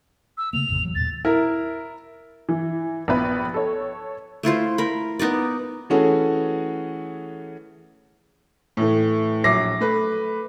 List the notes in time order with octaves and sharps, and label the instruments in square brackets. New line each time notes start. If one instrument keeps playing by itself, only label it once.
[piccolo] E6
[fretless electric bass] C#3 A3 A#3 [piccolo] F7
[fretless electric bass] A1 F2 C#3
E3 F#3
[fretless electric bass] D#2 A#2 [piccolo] A6
[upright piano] E4 A#4
[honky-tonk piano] E3
A#1 B3 B4
A4 C#5
[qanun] A3 E4 F4 C5
A#4 B5
B3 D#4 A#4 D5
[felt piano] E3 A3 C#4 F#4 G#4 A4
[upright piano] A2 E3 A3
A#1 F#3 E5 D6 A#6 C7
A3 B4